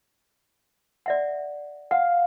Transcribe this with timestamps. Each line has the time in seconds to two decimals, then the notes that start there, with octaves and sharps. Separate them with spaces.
1.06 D5 E5 F#5
1.91 F5 F#5